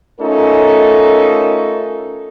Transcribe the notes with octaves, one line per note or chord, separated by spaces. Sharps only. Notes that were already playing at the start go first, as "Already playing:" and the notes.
A3 C#4 D#4 F4 A4 A#4